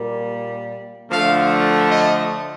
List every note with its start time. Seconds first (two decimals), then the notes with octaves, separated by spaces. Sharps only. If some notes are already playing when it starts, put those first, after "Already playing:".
Already playing: A#2 G3 A#3
1.09 D3 F3 A3 F5
1.89 D#5